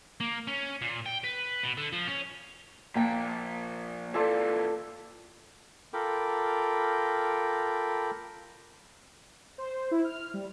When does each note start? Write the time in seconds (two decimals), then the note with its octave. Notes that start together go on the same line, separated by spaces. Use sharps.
0.20 A#3
0.47 C#4
0.81 A#2
1.06 G5
1.24 B4
1.63 B2
1.77 D3
1.92 F3
2.07 C#4
2.96 A#2 F3 A#3 G5
4.14 A#2 E3 F4 A4 D5
5.93 F4 A4 A#4 G5 B5 D6
9.58 C5
9.91 E4
10.04 F6
10.34 G3